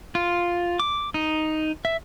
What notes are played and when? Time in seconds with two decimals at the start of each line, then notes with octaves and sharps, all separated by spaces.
0.15 F4
0.80 D6
1.14 D#4
1.85 E5